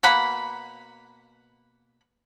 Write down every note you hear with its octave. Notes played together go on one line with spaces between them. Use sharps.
B2 A#3 F#5 B5